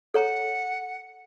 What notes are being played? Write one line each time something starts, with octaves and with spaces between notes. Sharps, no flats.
A4 C#5 F#5 A#5